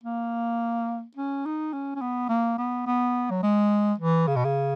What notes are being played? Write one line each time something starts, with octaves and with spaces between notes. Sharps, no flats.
A#3
C#4
D#4
C#4
C#4
B3
A#3
B3
B3
F#3
G#3
E3
C#3
B2
C#3